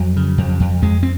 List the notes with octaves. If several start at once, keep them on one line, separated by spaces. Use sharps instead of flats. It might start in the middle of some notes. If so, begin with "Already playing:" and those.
Already playing: F2 F#3
C#3
F2
F2
F2 G#3
C4